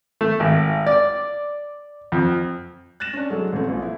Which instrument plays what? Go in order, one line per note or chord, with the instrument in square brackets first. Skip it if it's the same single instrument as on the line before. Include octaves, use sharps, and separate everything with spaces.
[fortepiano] A3
G#1
D5
F2
[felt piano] F#6 A6 A#6 E7
C#4 D4
F#3 G#3 A3
A1 F2 A3
A#1
E4